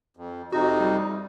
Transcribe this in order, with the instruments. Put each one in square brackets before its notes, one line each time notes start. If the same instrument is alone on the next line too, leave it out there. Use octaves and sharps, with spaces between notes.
[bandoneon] F2
[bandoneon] F2 C3 D#4 [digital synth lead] F#4
[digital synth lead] G3